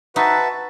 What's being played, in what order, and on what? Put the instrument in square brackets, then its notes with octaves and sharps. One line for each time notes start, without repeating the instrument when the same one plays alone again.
[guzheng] D#4 [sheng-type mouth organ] F#4 B4 E5 A5